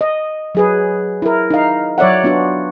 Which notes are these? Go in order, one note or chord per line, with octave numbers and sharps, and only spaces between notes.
D#5
F#3 G#4 B4
E4 A#4
D#4 F5
F#3 C#5 D5 E5 F#5
B3 D4 F4 F#4